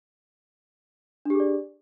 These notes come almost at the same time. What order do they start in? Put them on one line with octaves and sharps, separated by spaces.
D4 G4 G#4 D5